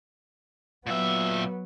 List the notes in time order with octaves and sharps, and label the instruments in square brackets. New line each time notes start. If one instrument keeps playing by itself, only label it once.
[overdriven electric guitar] A#2 E5 [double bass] F#3 B3